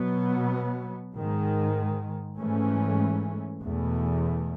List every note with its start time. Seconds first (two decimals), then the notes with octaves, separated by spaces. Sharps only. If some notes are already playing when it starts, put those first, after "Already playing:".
Already playing: B2 F#3 B3
1.14 G#2 D#3 G#3
2.38 G#2 E3 A3 C#4
3.61 E2 B2 A3